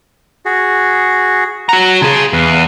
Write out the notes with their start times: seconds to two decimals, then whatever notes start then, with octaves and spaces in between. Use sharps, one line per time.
0.45 F#4 G#4
1.69 F#4 F#5 A#5
2.02 C#3 G#4 G#5 A5 C6
2.33 E2 B4 F5